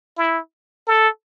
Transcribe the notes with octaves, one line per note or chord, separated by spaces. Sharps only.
E4
A4